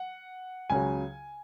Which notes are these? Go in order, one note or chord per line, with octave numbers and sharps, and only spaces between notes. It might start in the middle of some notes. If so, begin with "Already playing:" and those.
Already playing: F#5
C#2 C#3 F#3 G#5